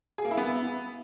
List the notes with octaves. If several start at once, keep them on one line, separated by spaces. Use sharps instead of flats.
G#4
A#3
E4
B3